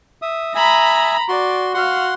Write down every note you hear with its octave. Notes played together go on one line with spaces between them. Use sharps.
E5 D#6
E5 G#5 A#5 B5 D#6
F#4 D5 C6
F#4 F5 F#5 C6